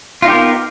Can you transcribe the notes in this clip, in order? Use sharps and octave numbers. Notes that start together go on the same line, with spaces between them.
B3 D#4 F4 G4 A#4